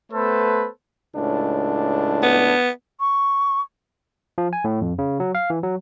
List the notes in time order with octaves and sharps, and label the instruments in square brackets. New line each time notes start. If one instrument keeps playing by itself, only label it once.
[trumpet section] A3 B3 A4 B4 C5
[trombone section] C#2 A2 D4
[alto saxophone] B3
[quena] C#6
[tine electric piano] F3
G#5
A2
F2
C#3
F#3
F5
E3
F#3